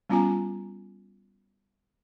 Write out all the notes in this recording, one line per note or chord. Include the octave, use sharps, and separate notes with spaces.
G3 B3 C#4 F4 G#5 A#5